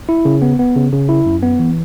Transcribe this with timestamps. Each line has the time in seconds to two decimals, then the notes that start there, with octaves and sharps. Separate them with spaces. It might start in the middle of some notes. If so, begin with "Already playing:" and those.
0.09 E4
0.25 C#3
0.42 B3
0.59 B3
0.76 C#3
0.93 C#3
1.09 E4
1.26 F#2
1.43 B3
1.59 E3